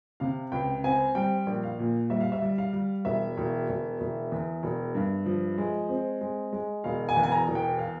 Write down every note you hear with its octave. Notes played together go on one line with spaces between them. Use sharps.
C3 F5
C#2 G5
C4 G#5
G3 G5
A#1
F5
A#2
G3 E5
F5
E5
G3
F5
G3
E1 E5
E1
E1
E1
E2
E1
G2
F3
G#3
C4
G#3
G#3
E1 F5
G#5
E2
G#5
A#5
E1
G5
F5